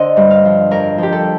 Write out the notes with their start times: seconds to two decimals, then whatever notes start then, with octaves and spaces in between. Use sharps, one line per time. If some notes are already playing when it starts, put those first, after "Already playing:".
Already playing: D3 A#4 C5 D#5
0.17 G2
0.30 F5
0.45 F3
0.71 F2 A#4
0.98 F3 G4
1.12 A4